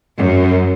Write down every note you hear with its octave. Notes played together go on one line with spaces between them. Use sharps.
F#2